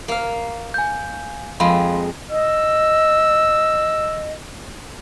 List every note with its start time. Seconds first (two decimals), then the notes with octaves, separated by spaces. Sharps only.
0.08 A#3 F5
0.74 G#5 G6
1.60 F2 G#3 F5 B5 C6
2.30 D#5 E6